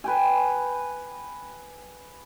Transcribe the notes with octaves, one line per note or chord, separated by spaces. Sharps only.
B4 G5 G#5